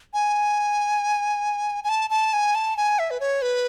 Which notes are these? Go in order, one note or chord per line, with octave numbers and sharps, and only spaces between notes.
G#5
G#5
A5
A5
G#5
A5
G#5
E5
B4
C#5
B4